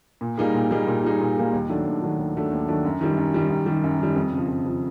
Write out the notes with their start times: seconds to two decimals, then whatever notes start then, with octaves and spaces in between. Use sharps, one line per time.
0.21 A#2
0.38 G3 A#3 D#4 G#4
0.54 A#2
0.71 G3 A#3 D#4 G#4
0.87 A#2
1.04 G3 A#3 D#4 G#4
1.20 A#2
1.37 G3 A#3 D#4 G#4
1.53 D#2
1.69 D#3 F#3 A3 D4
1.86 D#2
2.02 D#3 F#3 A3 D4
2.18 D#2
2.35 D#3 F#3 A3 D4
2.52 D#2
2.68 D#3 F#3 A3 D4
2.85 F#2
3.01 D#3 G3
3.17 F#2
3.34 D#3 G3
3.50 F#2
3.66 D#3 G3
3.84 F#2
3.99 D#3 G3
4.16 F2
4.32 C#3 F3
4.48 F2
4.65 C#3 F3